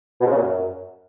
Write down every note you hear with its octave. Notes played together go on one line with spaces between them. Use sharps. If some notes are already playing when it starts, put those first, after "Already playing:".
B2
G#2
C#3
A#2
F#2